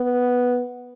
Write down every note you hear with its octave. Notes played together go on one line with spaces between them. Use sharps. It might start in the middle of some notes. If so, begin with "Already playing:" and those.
Already playing: B3